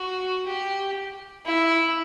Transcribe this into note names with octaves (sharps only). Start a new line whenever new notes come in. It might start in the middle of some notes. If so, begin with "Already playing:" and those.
Already playing: F#4
G4
E4